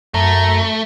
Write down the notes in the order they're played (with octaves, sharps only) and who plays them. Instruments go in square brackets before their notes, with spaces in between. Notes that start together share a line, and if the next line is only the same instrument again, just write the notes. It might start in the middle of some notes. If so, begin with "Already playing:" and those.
[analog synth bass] F#2 [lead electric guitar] A3 [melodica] A#5